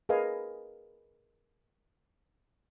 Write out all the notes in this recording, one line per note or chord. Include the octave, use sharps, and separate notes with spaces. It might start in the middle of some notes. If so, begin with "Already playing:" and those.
G#4 A#4 B4 D#5 F5 G#5